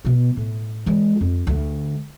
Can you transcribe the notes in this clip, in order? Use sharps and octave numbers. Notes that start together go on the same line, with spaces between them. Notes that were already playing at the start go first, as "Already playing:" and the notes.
B2 B3
A2
E3 G#3
F2
D2 A3